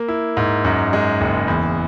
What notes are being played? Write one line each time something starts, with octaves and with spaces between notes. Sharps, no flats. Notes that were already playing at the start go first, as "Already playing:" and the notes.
Already playing: A#3
E4
G#2
F#2
G#3
F#1
E2